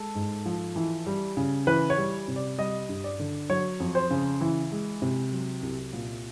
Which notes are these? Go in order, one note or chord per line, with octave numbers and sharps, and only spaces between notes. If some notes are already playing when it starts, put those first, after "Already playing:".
Already playing: G#3 A4
G#2
F3
E3
G3
C#3
E3 B4
C#5
G3
C3
D5
G3 D#5
G2
D5
D3
F#3 C#5
F2
C5
C#3
E3
G#3
C3
F#3
C2
A#2